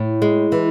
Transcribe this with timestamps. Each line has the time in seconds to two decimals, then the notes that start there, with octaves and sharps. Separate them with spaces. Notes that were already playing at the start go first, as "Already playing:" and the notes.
Already playing: A2
0.22 G#3
0.52 E3